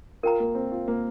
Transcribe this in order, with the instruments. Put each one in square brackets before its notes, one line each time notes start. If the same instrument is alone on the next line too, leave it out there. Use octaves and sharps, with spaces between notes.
[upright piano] F4 [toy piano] A#4 G5 A#5
[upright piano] A#3
C4
F4
A#3